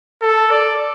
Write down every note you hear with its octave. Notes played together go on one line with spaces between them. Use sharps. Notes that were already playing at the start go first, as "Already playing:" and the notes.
A4
D5